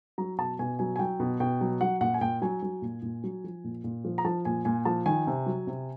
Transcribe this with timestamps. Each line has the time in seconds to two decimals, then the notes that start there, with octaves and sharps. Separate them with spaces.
0.18 F#3 A#5
0.38 B2 A5
0.59 B2 G#5
0.79 F#3 G#5
0.96 G#5
0.99 F#3 G5
1.20 B2
1.40 B2 G5
1.61 F#3
1.81 F#3 F#5
2.01 A#2 F#5
2.14 G#5
2.21 A#2 G5
2.42 F#3 G#5
2.62 F#3
2.82 A#2
3.03 A#2
3.24 F#3
3.44 F3
3.64 A#2
3.84 A#2
4.05 F3
4.18 A#5
4.25 F3 A5
4.45 A#2 G#5
4.65 A#2 G#5
4.85 F3 A5
5.06 D#3 G#5
5.27 C3
5.46 F#3
5.67 C3